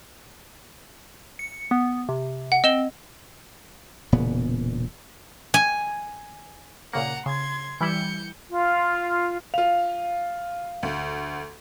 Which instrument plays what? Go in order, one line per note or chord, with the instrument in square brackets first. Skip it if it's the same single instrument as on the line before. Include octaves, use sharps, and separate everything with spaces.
[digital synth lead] C#7
B3
C3
[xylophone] F#5
[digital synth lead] C4 [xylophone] D#5 E7 G7
[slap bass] E1 A#2 C#3 B3
[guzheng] G#5
[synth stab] A#2 C#3 A#3 [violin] F#5 A#5
[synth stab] C#3 [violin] C6 G#6
[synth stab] E3 G3 E4 [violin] G6 C#7
[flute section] F4
[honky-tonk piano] F4 F7 [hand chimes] F5
[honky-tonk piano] D2